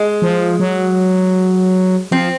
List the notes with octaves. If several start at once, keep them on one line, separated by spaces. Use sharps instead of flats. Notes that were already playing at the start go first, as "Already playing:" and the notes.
Already playing: G#3
F3
F#3
F3 C4